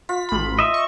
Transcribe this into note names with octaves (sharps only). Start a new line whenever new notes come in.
F4 B6
A1 B5
D#5 E5
C#6